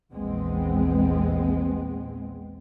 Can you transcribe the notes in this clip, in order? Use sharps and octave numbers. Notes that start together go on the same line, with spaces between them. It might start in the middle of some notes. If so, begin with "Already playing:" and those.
A#1 E2 G#3 B3 C4